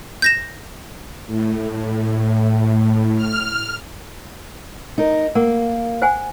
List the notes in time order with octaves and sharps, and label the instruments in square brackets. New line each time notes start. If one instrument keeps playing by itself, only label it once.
[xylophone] G6 A#6 E7
[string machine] A2
F6
[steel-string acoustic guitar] D#4 A#4
[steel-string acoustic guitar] A#3 [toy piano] A#4 F#5
[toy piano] C5 F#5 G#5